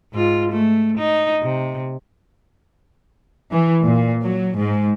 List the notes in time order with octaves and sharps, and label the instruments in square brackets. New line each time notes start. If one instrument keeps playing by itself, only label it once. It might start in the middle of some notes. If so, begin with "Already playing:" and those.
[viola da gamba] G#2 F4
A3
D#4
C3
[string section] E3
A#2
F#3
G#2